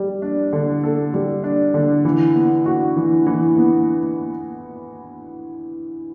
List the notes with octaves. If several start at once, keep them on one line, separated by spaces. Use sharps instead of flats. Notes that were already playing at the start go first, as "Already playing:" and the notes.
Already playing: G3
D4
D3
A4
G3
D4
D3
E3
B3
F#4
E3
E3
B3